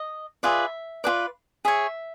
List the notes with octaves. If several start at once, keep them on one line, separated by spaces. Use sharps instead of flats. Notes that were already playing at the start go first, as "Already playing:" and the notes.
Already playing: D#5
F4 G#4 B4 D5 E5
F4 G#4 B4 D5
G#4 C#5 E5